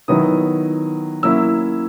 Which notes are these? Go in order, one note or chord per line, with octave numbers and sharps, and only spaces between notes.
D#3 F#3 B3 E4 D#6
F#3 A#3 C#4 E4 E6